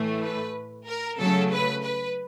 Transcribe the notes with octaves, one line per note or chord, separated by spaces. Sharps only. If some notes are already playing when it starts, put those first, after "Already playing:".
Already playing: A2 E3 A3
B4
A#4
C#3 F#3 A3 A4
B4
B4